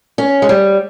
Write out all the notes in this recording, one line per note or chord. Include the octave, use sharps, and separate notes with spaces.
C#4
G#3
G3